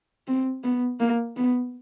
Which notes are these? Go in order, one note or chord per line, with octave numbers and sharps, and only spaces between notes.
C4
B3
A#3
B3